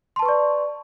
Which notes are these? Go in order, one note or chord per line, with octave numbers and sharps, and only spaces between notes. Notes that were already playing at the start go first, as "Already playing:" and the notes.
B4 D5 A5 C6 C#6